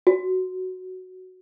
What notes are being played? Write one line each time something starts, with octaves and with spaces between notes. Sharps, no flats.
F#4